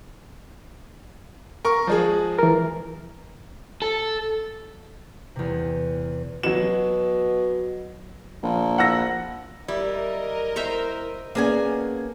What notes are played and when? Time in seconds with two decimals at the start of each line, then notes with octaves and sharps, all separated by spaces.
1.65 A#4 C#6
1.87 F3 G#3 G#4
2.39 E3 A#4
3.82 A4
5.36 E2 C3
6.43 B2 F#3 E7
8.43 A#1
8.78 F#5 E6 A#6
9.68 G3 E4 A#4 D#5
10.56 C5 E5 A#5
11.35 A#3 B3 C#4 D4 G#4 G#5